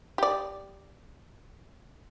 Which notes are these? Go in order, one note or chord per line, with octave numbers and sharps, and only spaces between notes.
G4 D5